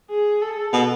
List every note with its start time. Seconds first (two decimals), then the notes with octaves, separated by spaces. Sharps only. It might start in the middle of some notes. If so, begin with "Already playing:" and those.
0.10 G#4
0.41 A4
0.73 B2